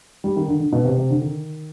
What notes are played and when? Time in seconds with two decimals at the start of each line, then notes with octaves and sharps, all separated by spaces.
0.24 G3
0.36 D#3
0.48 D3
0.60 D3
0.72 B2
0.85 C3
0.97 C3
1.10 D3
1.22 D#3